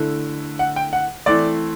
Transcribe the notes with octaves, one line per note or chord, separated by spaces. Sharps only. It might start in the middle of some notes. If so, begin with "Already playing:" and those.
Already playing: D3 A3 E4
F#5
G5
F#5
E3 A3 C4 E4 D5